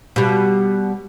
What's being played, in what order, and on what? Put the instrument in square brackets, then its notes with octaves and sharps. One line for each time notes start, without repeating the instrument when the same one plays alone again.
[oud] B2 G3